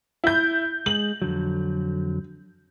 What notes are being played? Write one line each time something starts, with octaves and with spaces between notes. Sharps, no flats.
E4 G6
G#3 F#7
F2 D3 F#3